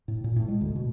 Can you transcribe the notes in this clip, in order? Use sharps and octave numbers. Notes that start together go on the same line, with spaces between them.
A2
A#2
A2
G#3
D2
B2